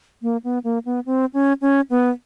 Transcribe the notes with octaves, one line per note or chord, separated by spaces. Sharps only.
A#3
B3
A#3
B3
C4
C#4
C#4
B3